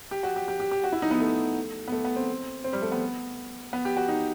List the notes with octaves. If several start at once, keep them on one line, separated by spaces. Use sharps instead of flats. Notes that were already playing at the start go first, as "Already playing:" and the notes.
G4
F#4
G4
G4
G4
G4
F#4
E4
D#4
B3
A3
B3
A3
B3
C4
C4
G3
A3
B3
B3
G4
F#4
D#4